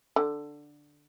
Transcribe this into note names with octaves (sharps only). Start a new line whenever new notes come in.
D3